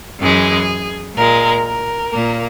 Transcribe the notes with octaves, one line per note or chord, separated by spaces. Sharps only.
F#2 E3 G#3 G#4
A#2 G#3 A#4
A#4
A#2 A#3